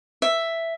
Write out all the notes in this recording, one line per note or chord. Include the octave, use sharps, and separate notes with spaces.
E5